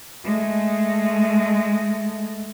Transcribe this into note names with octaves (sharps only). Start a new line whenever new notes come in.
G#3 A3